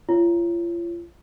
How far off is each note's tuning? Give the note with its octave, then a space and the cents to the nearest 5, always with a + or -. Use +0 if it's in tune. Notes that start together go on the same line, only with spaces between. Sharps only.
F4 -35 C#5 +0